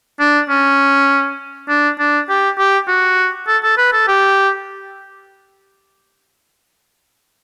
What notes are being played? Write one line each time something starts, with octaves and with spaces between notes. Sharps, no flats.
D4
C#4
D4
D4
G4
G4
F#4
A4
A4
B4
A4
G4